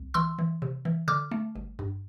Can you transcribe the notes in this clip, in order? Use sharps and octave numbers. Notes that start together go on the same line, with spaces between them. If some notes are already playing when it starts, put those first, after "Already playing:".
Already playing: C2
E3 C6 E6
E3
C3
E3
D3 D6 F6
A3
G1
G2